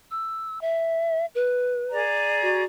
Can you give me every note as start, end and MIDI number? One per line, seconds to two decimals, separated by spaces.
0.11 0.61 88
0.61 1.26 76
1.35 2.03 71
1.90 2.63 68
1.90 2.63 74
1.90 2.63 82
2.42 2.64 66